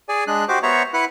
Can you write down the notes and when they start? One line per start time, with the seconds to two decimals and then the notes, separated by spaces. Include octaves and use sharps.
0.09 G#4 D5 G#5
0.27 G#3 D4 F#6
0.49 F#4 G4 C5 D6
0.63 B3 C5 C#5 E5 A#5 C#6
0.94 E4 B4 F#5 F#6